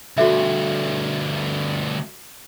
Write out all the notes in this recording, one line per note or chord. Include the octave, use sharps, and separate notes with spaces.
D2 G2 F#4 A4 E5